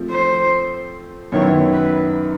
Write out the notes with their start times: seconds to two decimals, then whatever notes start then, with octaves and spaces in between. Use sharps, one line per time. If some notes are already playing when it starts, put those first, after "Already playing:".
Already playing: F3 A3 C4
0.10 C5
1.32 F#2 D#3 F#3 B3 E4 C#5
1.73 B4